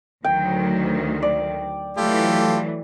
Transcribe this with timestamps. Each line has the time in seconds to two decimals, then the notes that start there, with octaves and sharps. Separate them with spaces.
0.24 D2 D#3 F#3 G5
1.22 D5
1.97 E3 F#3 A3 F4 G4 A4